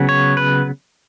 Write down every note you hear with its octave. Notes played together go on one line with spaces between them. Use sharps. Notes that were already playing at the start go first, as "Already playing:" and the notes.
Already playing: C#3 F#3 B3
C#5
B4